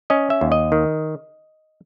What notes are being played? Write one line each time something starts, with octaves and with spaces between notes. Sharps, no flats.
C#4 D#5
E5
D#2
D#5
D#3